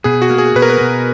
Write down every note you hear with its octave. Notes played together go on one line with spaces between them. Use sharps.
B2 G#4
F#4
A#3
G#4
B2 B4
A#4
B4
B2